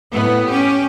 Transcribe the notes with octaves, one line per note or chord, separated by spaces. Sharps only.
A2 B3
C#4 G4